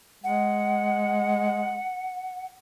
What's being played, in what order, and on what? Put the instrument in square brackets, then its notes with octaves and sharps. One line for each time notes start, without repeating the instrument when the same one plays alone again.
[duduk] G#3 [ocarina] F#5